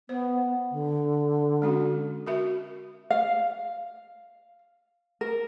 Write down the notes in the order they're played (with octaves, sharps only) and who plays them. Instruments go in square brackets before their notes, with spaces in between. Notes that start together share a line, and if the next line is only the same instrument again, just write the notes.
[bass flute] B3 [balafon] C5
[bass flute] D3
[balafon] G#3 C#4 F#4
F#4 A#4 E5
[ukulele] F5
A#4